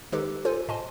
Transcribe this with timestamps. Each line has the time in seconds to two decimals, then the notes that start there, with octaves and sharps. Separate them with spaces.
0.12 D#3 G#3 D#4 G4 A4 B4
0.45 F4 A4 C5 G#5
0.68 A2 D#5 G#5 A5 C6